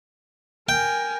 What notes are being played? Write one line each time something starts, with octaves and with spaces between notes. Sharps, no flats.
A#4 G5 G#5